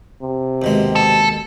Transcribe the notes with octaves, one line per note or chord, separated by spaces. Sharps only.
C3
D#2 B2 G#3
A4